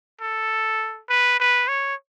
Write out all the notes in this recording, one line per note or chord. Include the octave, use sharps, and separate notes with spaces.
A4
B4
B4
C#5